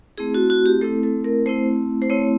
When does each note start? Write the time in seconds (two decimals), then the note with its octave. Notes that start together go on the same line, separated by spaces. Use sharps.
0.18 A3 C4 E4 G#4
0.34 F#4
0.50 F#4
0.66 G4
0.81 A3 C4 E4 A4
1.03 A4
1.24 A#4
1.46 A3 C4 E4 C5
2.02 C5
2.10 A3 C4 E4 C#5